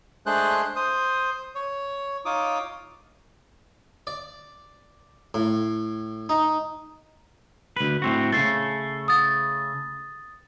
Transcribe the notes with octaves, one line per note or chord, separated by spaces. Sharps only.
G#3 A3 D4 G#4 C5 F#6
C5 D#6
C#5
D#4 F4 C#5 D6 D#6
D5
A2
D#4
D2 B4
A2 C4 F#4
C#3 A3 A6 C7
D#6 A6